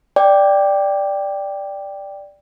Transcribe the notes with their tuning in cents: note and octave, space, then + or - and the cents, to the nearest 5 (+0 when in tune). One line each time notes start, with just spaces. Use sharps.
D5 +0 G5 +5